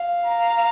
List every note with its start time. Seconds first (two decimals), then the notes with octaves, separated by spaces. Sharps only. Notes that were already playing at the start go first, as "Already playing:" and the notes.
Already playing: F5
0.26 A#5